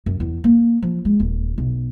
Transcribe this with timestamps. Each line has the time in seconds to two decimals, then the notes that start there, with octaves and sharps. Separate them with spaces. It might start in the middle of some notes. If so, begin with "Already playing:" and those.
0.06 F#2
0.20 E2
0.44 A#3
0.82 F3
1.05 G#3
1.20 D#1
1.58 B1